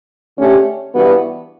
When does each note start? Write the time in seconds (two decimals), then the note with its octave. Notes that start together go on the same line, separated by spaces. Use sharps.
0.38 D3 A3 C#4 G4
0.94 G2 E3 B3 F#4